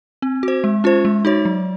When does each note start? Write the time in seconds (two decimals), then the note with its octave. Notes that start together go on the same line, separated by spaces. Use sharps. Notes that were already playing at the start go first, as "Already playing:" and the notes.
0.22 C4
0.43 F#4 C5
0.64 G#3
0.84 C#4 F4 C5
1.05 G#3
1.25 D#4 F#4 C#5
1.45 F#3